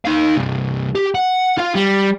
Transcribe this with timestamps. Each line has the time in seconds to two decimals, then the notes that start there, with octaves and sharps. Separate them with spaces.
0.05 D#4 F5
0.36 C2 G2
0.95 G4
1.15 F#5
1.57 F4 F5
1.75 G3